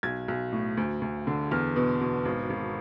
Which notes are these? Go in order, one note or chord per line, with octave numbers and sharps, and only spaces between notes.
B1 G#6
B1
A2
D2
D2
D3
E2 F6
B2
B2
G#1
G#1